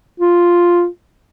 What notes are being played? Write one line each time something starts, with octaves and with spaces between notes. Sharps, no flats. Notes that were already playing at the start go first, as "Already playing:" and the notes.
F4